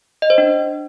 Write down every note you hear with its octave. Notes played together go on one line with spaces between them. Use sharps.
D#5
C5
D4